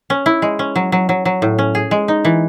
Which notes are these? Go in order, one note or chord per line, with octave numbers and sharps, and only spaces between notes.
C#4
E4
G#3
C#4
F#3
F#3
F#3
F#3
A2
C#4
G#4
G#3
D#4
E3